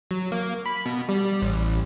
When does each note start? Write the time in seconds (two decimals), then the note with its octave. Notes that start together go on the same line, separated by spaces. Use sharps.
0.11 F#3
0.32 A#3
0.66 B5
0.86 B2
1.09 G3
1.42 A1